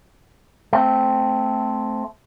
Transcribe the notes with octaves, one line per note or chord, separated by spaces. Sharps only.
A3 C4